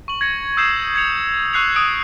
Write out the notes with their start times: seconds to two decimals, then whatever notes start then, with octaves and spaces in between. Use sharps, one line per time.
0.08 C#6 F#7
0.21 G#6 A#6 C#7
0.57 D#6 E6 G6 C7 E7
0.95 G#6 C7 C#7 F7
1.53 C#6 E6 F#6 C7 C#7 F7
1.76 D#6 D7 F7